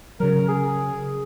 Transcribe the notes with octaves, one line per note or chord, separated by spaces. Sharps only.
C#3 F#3 A#4
G#4